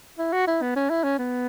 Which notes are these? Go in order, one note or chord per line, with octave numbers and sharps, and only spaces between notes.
E4
F#4
E4
B3
C#4
E4
C#4
B3